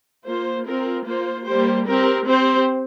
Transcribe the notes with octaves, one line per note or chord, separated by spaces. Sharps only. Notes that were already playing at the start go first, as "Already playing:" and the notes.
A#3 F4 C5
C4 F4 A#4
A#3 F4 C5
G3 A#3 G4 C5
C4 G4 A#4
C4 G4 C5